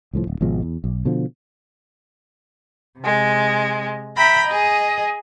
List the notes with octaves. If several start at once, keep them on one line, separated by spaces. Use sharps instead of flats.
C2 A2 F3
D1
G#1 B2 F3 G#3
E2
B1
B2 D3 F3
C3 G#3
E5 G5 A#5 B5
G#4 D#5